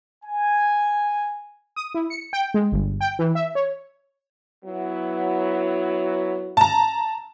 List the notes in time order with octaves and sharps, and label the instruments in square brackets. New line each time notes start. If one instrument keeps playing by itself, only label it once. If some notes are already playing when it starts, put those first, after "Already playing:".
[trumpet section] G#5
[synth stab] D#6
E4
C#7
G5
G#3
G1
G5
E3
E5
C#5
[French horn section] F#3 B3 E4
[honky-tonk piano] A5 A#5